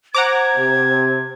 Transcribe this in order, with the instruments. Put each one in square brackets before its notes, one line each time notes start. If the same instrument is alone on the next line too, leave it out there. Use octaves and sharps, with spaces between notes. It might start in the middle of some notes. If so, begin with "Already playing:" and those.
[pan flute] C5 [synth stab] F#5 A#5 D6 [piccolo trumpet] G#6
[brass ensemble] C3